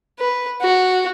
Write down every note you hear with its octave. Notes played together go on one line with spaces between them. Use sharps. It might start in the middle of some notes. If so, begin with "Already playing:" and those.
B4
F#4